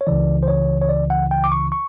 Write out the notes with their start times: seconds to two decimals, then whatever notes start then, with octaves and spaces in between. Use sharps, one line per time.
0.01 C#5
0.07 C#2 C#3 E3 D5
0.43 C5
0.48 C#5
0.82 C#5
0.89 D5
1.10 F#5
1.31 G5
1.44 D6
1.52 C#6
1.72 C#6